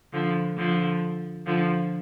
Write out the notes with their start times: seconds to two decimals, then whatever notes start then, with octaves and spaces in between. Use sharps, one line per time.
0.13 D3 F3
0.57 D3 F3
1.46 D3 F3